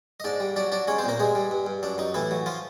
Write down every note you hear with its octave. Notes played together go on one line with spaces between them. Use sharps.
D#5
G#2 D4 D5
G3
F#3 D4 D5
F#3 D4 D5
G#3 C#4 C#5
C4 C5
A#2 A#3 A#4
G2 G#3 G#4
G3
G2
G2
F#2 D4
F#2 D#4
A2 E3 E4
F#3
F3 F4